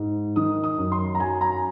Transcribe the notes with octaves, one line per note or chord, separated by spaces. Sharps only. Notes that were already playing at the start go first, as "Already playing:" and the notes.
Already playing: G#2
D#3 D#6
D#6
F#2
C6
A#5
F#3 G#5
A#5